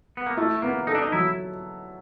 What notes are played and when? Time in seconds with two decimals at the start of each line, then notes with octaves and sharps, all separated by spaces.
0.17 B3
0.26 A#3
0.37 A3 E4
0.62 A#3 B3
0.87 D#4 A4
0.95 D4
1.02 D#4
1.12 F#3 E4